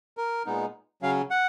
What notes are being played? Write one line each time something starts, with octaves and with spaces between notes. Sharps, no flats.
A#4
A#2 G#3 B3 D#4
C#3 F#3 C#4 F5
F#5